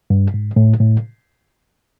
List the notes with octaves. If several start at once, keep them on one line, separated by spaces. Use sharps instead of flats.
G2
G#2
A2
A2